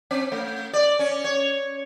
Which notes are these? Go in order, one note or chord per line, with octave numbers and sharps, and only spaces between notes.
C4
A3
D5
C#4
C#5